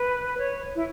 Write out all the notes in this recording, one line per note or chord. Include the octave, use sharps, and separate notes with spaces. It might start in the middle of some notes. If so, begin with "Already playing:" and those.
Already playing: B4
C#5
E4